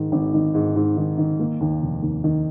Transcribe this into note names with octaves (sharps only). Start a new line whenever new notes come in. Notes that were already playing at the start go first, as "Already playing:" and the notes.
Already playing: G#2 D#3
G#1
D#3
G#2
G#2
D#3
D#3
A#3
D#2
F1
D#2
D#3